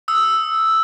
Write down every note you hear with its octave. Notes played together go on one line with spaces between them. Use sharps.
D#6 E6